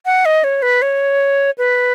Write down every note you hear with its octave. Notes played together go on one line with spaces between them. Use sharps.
F#5
D#5
C#5
B4
C#5
B4